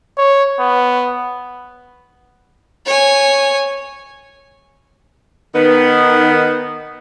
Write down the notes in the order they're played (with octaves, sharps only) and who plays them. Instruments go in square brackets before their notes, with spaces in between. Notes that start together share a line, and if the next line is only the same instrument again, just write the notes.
[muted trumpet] C#5
B3
[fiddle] C#5 G#5
[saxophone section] D#3 B3